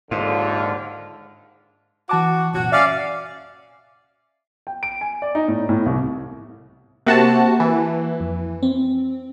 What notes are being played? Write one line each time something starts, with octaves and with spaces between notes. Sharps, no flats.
A#1 D#2 G#2 D3 F4
E3 F#4 A5 D6
C2 F#2 A#2 F#4
C#4 D5 E5 F5
G5
D7
G#5
D5
D#4
A2
A2
C2
C3 A#3 F#4 A5
E3
F2
C4